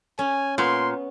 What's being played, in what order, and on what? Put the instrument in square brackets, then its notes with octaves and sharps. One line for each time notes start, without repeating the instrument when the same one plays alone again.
[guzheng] C#4 [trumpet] G#5
[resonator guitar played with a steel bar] A#2 [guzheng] B3 [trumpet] C6